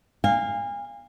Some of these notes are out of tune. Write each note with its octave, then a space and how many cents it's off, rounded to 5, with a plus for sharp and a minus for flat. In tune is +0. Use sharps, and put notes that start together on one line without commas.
F5 +0 G#5 -35